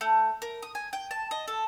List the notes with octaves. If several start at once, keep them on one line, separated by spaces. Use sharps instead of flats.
A3
A#4
D#6
G#5
G5
A5
D#5
A4